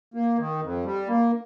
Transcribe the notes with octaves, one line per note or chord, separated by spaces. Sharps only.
A#3
D#3
F2
G3
A#3